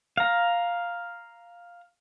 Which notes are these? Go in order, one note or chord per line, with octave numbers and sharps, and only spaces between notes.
F5 A#5